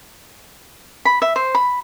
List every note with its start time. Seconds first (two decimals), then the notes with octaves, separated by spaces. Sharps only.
1.05 B5
1.22 E5
1.36 C5
1.55 B5